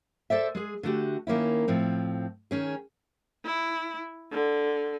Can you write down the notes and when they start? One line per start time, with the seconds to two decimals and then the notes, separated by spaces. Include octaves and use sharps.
0.30 A4 C5 D5 E5
0.55 G#3 G#4
0.83 D3 A3 F#4 G4
1.27 D#3 A#3 C#4 E4
1.68 A2 F3 C4
2.51 D#3 C#4 G#4
3.45 E4
4.32 D3